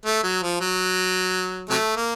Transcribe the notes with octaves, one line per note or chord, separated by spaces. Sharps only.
A3
F#3
F3
F#3
C3 F#3 A3
A#3